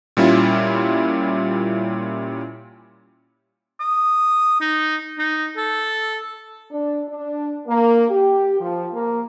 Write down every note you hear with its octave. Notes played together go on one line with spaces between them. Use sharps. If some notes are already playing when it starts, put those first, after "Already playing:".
A#2 G3 C#4 E4 F4
D#6
D#4
D#4
A4
D4
D4
A#3
G4
F3
A#3